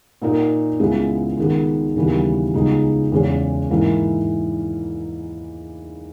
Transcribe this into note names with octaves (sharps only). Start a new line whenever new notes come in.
A#2 A#3 D#4 A#4
C#2 C#3 G#3 B3 E4
D#3 G#3 B3
D#2 C#3 E3 G3 B3
C#2 C#3 G#3 B3 D#4
E2 C#3 E3 G#3 C#4
G#2 E3 A#3 E4 A#4